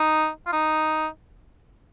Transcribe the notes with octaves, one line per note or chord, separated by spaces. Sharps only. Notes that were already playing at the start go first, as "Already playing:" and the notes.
Already playing: D#4
F4
D#4